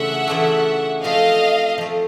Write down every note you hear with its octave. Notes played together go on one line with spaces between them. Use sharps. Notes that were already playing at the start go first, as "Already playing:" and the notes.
Already playing: C#3 E3 A3 D4 F4 E5 F#5
C#3 E3 A3 D4 F4
F3 A3 C4 D#5 F5
F3 A3 C4